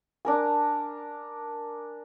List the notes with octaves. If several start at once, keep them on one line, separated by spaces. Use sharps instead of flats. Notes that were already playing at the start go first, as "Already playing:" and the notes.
D4 A#4 G#5